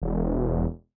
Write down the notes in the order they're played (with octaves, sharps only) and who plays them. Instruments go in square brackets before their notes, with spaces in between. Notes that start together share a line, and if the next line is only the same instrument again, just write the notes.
[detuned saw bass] E1